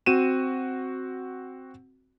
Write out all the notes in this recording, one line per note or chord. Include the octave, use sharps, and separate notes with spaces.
C4 F#4 D#7 E7